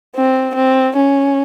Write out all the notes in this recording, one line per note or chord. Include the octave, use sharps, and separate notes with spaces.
C4
C4
C#4